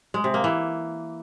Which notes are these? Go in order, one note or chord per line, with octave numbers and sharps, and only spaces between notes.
G#3
C3
A#3
E3